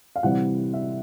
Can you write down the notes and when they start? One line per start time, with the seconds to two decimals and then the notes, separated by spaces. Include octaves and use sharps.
0.16 F5
0.23 C3 E3 G3 C4 F#5
0.74 E5